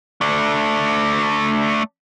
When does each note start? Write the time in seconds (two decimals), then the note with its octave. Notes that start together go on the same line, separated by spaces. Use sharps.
0.21 A3 D4